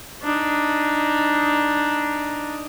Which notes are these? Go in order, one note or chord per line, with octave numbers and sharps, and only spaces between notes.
D4 D#4